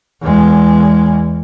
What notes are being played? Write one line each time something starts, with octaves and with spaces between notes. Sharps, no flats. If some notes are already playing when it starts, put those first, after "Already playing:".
E2 G#3